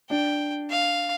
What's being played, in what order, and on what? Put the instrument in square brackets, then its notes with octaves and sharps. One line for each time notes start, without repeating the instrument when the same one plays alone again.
[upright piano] D4 [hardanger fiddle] G5
[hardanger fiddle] F5